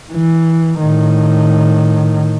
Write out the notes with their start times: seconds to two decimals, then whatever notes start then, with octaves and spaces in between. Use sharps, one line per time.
0.12 E3
0.80 A2 D#3